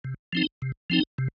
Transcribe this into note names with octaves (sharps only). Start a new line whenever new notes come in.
C3
F3 C4 D#4
C3
F3 C4 D#4
C3